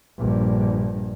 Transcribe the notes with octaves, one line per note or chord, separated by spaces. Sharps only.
A#1 G2